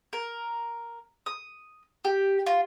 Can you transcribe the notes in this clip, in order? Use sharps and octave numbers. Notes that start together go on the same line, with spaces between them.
A#4
D#6
G4
F4